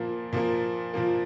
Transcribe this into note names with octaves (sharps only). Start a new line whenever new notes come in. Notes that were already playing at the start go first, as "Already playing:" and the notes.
Already playing: A#2 F3 A#3
A#2 F3 A#3
A#2 F3 A#3